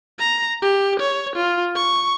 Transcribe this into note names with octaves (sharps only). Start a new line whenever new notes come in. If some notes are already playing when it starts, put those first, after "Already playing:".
A#5
G4
C#5
F4
C#6